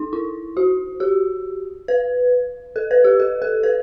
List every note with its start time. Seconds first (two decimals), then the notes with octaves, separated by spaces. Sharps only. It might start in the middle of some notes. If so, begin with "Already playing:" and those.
Already playing: D#4
0.13 E4
0.57 F#4
1.00 G4
1.88 B4
2.76 A4
2.91 B4
3.04 G4
3.20 A4
3.42 A4
3.63 B4